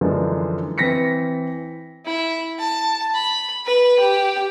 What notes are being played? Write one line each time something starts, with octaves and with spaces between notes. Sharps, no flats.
F#2 D3 E3 F3 G#3
E3 C4 A#6 B6 C#7
E4
A5
B5
B4
G4